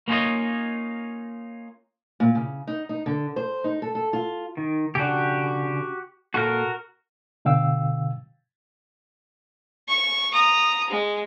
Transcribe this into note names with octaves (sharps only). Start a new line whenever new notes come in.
A#3 C#4 D#4 F4 C#5 D#5
A#2
C#3
D#4
D#4
D3
C5
D#4
A4
A4
F4
D#3
C#3 D4 F#4 G4
A#2 F4 F#4 A4 A#4
B2 D3 F5 G5 E6
C#6
A#5 D#6
G#3